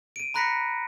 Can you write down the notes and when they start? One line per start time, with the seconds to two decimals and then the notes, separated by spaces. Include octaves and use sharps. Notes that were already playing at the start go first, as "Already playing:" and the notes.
0.16 D7 D#7
0.34 A#5 B5 F#6 A#6 B6 C#7